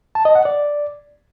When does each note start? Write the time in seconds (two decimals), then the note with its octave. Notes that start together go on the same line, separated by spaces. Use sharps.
0.15 A5
0.25 D#5
0.35 F#5
0.45 D5